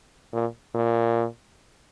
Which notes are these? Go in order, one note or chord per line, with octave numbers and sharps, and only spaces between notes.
A#2
A#2